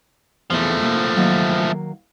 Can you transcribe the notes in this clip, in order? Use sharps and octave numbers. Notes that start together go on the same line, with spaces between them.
E2 F3 A3 G#4 E5
C3 A#3
D#3 F#3 A#3